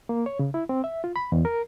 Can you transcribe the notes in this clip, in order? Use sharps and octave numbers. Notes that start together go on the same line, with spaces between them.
A#3
C#5
C#3
E4
C4
E5
F4
B5
E2
A#4